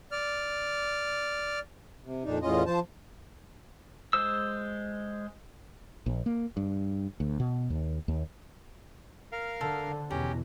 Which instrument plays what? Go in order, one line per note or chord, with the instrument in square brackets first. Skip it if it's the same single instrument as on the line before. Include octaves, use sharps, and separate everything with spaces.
[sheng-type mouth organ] D5 F6
[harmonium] C3
F2 A#2 D4 D#4
E2 A2 C#4 F4 D#5
F3 C5 A5
[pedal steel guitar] G#3 C5 E6
[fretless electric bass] A#1
A#3
G2
D2
B2
D#2
D#2
[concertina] A#4 F5
[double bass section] D3 [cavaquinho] A4 C5
[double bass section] E2 B2 E3 [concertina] C#4 G4 [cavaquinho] A#5